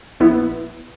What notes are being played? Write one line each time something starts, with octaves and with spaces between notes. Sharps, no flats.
A#1 B3 E4